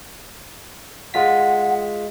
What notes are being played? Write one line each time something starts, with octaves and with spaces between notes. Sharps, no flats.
G#3 F4 F#5 B6